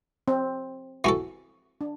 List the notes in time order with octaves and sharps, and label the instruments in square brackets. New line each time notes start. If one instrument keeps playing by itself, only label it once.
[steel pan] C4
[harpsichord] E3 B3 F#4 A4
[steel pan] D4